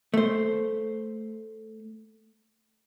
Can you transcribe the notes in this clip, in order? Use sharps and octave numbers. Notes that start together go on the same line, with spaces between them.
A3 C5